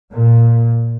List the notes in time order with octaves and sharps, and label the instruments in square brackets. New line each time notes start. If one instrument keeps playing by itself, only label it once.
[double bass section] A#2